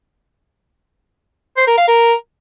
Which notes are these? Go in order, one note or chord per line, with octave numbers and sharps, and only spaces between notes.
C5
A#4
F5
A#4